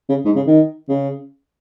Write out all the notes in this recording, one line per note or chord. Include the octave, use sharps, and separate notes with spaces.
C#3
G#2
C#3
D#3
C#3